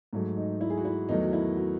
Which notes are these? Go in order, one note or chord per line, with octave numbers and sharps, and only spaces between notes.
G#2 F#3 A3
D#4
E4
G#4
F#4
E4
E2 D#3 F#3 A3 D#4
F#4
E4
F#4